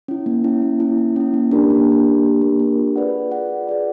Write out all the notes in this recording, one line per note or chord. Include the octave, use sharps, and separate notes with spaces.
C#4 E4
A#3
C#4 E4
A#3
C#4 E4
A#3
C#4 E4
A#3
D4 G4 A#4
A#3
D4 G4 A#4
A#3
D4 G4 A#4
A#3
D4 G4 A#4
F4
G#4 B4 D5 F#5
F4
G#4 B4 D5 F#5
F4
G#4 B4 D5 F#5